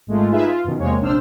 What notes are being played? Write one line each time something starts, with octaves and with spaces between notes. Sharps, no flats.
G#1 G#3 A3 F4
D#4 F4 G#4 B4 E5
F4
F#2 B2 D#3
E2 C3 G#3 A#3 C#5
A#1 C3 D4 C5 E6 F6